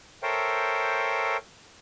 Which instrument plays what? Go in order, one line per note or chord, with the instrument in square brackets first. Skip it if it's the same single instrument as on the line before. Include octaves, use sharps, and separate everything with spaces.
[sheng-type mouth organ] A4 A#4 C5 C#5 E5 G5